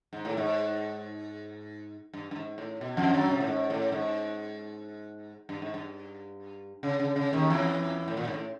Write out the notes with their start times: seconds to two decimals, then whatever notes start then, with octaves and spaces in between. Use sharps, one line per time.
0.13 G#2
0.25 A2
0.37 G#2
2.13 G2
2.31 G2
2.36 G#2
2.58 A2
2.81 B2
2.97 F2 F3
3.14 F#2 F#3
3.31 C3
3.40 A2
3.47 G#2
3.70 A2
3.92 G#2
5.49 G2
5.62 G#2
5.74 G2
6.83 C#3
7.00 C#3
7.16 C#3
7.33 D#2 D#3
7.50 E2 E3
8.08 A2
8.17 A#2
8.28 G#2
8.34 A2